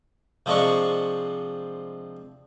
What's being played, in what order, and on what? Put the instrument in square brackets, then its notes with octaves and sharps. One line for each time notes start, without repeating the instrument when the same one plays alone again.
[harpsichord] C3 F3 G#3 D4 C#6